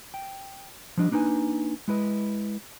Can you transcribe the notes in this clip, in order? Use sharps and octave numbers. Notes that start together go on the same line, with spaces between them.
G5
F3 G3 D4 D#5
A#3 D4 D#4 B4 G#5
G#3 E4 B4 D#5